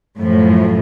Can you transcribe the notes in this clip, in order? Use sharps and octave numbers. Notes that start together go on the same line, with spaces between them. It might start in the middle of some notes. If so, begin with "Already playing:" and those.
F#2 A2 F3